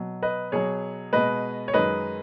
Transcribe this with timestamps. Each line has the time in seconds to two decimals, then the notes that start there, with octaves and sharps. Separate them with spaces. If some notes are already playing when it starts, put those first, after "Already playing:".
Already playing: B2 F#3
0.22 B4 D#5
0.52 B2 F#3 G#4 C#5
1.13 B2 G#3 B4 D#5
1.68 C#5
1.74 F#2 D#3 G#3 B4 D#5